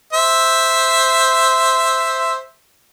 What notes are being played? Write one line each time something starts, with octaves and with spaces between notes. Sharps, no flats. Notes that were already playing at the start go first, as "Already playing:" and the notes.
C5 E5